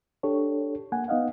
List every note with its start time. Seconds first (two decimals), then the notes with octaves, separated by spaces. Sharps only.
0.23 D4 G4 A4 C#5
0.92 A#3 F#5 G#5
1.08 B3 D#4 D#5 F5 F#5